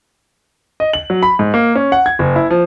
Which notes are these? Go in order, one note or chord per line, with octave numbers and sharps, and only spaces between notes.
D#5
F#7
F#3
B5
G#2
A#3
C#4
F#5
G#6
F#1
E4
F3